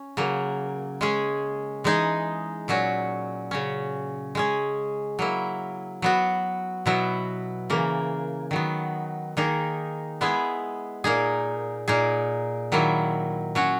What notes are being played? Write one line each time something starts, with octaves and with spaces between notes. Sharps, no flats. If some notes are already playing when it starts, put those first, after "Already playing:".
Already playing: C#4
C#3 F#3 A#3
G#3 C#4 G#4
E3 G#3 D#4 G#4
A#2 F#3 C#4 F#4
C#3 F#3 C#4
G#3 C#4 G#4
F#3 A#3 E4
F#3 B3 F#4
B2 F#3 B3 E4
C#3 E3 A#3
D#3 F#3 B3
D#3 A#3 D#4 G#4
G#3 B3 E4 G#4
A#2 A#3 D#4 G#4
A#2 A#3 D#4 G#4
D#3 F#3 A#3 E4
F#3 C#4 F#4